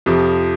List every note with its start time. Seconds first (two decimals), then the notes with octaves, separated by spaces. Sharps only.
0.06 F2 C3 F3